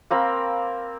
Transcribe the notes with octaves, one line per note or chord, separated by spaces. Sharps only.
A#3 C4 A#4 B5